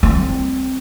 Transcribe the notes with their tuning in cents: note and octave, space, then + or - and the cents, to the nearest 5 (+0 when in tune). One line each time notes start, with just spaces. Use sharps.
G3 +25 C4 +0